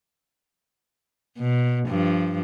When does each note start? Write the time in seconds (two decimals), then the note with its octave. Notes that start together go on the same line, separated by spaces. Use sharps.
1.38 B2
1.88 G2 F3